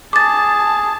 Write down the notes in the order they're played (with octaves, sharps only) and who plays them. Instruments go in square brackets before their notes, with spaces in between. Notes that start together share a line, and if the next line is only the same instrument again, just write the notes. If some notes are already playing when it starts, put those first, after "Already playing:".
[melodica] G#4 [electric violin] A5 [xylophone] D6 A6